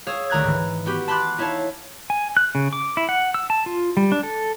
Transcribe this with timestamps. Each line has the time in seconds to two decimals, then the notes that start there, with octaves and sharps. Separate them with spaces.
0.07 G#4 C#5 F5 D#6 E6
0.30 D2 D#3 A#5 F#6 G#6
0.44 G#2 E3
0.86 B3 F#4 G4
1.08 A5 B5 C6 D6 F#6 A6
1.38 D#4 E4 C#5 E5 F5 A5
2.10 G#5
2.37 F#6
2.55 C#3
2.73 D6
2.97 E4
3.09 F#5
3.34 E6
3.50 A5
3.66 F4
3.97 G3
4.12 D4
4.23 A4